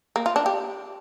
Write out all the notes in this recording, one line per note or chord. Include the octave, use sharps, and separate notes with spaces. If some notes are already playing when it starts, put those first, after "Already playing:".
A#3
F4
D4
G4